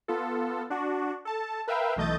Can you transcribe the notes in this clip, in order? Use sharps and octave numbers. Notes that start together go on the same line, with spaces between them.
B3 F4 A4
D4 F#4
A4 A5
A#4 B4 E5 F5 G5
B1 E3 A3 D#5 G6 A6